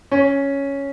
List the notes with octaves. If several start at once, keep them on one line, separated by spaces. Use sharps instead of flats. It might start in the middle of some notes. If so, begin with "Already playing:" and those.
C#4